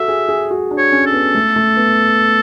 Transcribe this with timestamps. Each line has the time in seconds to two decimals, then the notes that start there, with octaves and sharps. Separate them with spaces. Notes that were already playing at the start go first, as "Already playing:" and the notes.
Already playing: F#4 A4 E5
0.08 G#4
0.29 G#4
0.51 F#4
0.71 D4
0.78 C#5
0.92 C#4
1.06 A4
1.13 B3
1.35 A3
1.56 A3
1.77 B3